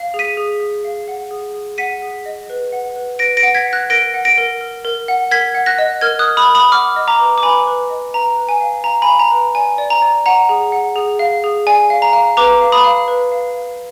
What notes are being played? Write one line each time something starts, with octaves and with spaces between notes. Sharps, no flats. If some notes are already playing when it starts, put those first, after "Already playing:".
Already playing: F5
G#4
B6 D#7
G#4
G#4
F5
F#5
G#4
G#4
F#5 B6 D#7
G#4
D#5
B4
F#5
B4
B4 A#6 D7
A#6 D7
F#5
G#6 B6
F#5
F#6 A#6
A#4 A#6 D7
F#5
A#6 D7
A#4
A#4
A#4
F#5
A#4 G#6 B6
F#5
F#6 A#6
D#5
A#4 F6 G#6
D#6 F#6
A#4
B5 D#6
A#4
B5 D#6
F#5 D6 F6
D#5
A#5 D6
B4
D6
B4 G#5 B5
B4
D#5
B4 A#5
B4
G#5
F5
F5 A#5
G#5 B5
F5
A#5
B4
D5 G#5
D5
A#5
D5
F#5 A#5
G#4
F#5
G#4
F5
G#4
D5 G#5
F5
A#5
F5
B4 A#5 D6
F5
B5 D#6
F5
B4
F5
F5